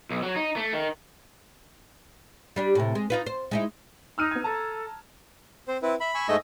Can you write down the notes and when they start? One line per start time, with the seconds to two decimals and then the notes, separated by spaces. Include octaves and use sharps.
0.11 B1
0.23 F#3
0.36 D#4
0.57 A3
0.73 D#3
2.56 G3 D4 G4
2.75 A2 C3
2.95 G#3
3.10 D#4 F4 B4
3.26 C5
3.51 G#3 D#4 E4
4.18 D#4 E6 F6 D#7
4.31 B3 G#6
4.44 A4 A5 A#5
5.68 C4 C5
5.82 C4 E4 B4
6.00 E5 B5
6.14 G#5 C#6 E6
6.29 G#2 A3 D#5